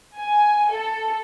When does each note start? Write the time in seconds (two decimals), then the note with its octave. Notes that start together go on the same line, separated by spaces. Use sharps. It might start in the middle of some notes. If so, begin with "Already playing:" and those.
0.16 G#5
0.71 A4